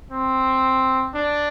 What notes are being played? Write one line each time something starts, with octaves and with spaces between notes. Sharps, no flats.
C4
D4